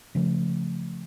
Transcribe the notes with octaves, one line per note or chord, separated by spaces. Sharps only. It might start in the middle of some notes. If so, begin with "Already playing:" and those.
C#3 F3 A3